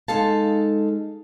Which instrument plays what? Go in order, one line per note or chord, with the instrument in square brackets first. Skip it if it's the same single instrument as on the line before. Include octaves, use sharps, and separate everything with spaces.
[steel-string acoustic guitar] G#3 D#4 A4 F5 A5